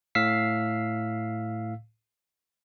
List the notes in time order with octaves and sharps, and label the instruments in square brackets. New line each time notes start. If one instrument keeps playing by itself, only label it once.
[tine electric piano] A2 F5 E6 B6 C7